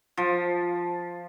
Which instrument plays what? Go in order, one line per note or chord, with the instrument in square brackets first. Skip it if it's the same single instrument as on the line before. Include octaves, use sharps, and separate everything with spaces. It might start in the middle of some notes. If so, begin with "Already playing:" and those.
[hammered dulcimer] F3